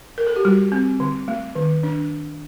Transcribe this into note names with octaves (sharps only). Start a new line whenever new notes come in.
A#4
A4
G4
G3 F#4
C4
D3
A3
D#3
D4